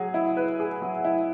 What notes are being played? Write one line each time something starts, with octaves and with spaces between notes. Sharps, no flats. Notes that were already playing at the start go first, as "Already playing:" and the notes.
Already playing: F#3 G#4
E4
B4
G#4
F#3
E4